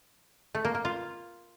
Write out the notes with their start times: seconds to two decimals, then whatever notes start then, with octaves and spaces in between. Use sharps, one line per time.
0.55 A3
0.65 A#3
0.75 A#3
0.85 F4